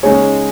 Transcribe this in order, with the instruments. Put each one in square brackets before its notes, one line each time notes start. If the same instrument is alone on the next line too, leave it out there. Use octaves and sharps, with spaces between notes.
[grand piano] C#3 G#3 D#4 G#4 C#5